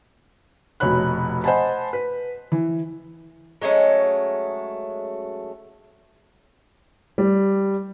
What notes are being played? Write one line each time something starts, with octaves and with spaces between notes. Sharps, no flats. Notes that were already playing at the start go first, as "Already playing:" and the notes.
F1 B2 C#5 B5 F#6
C5 D#5 F#5 G#5 A5 B5
B4
E3
F#3 G#3 A3 C#4
G3